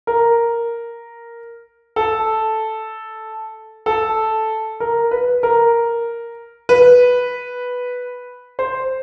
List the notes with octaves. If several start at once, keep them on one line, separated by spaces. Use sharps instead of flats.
A#4
A4
A4
A#4
B4
A#4
B4
C5